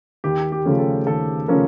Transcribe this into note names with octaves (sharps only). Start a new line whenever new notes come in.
D#2 G4
G4
C#3 F3 A3 C#4
A4
D#2 A4
C#3 F3 A3 C#4 A#4